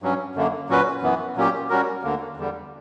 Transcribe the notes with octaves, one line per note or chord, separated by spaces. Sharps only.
G2 F#3 C#4
F#2 D3 A#3
A#2 F#3 C#4 F#4 B4
F#2 E3 B3
A#2 F#3 A#3 C#4 G4
G3 C#4 F#4 A#4
D2 D3 A#3
E2 D3 G3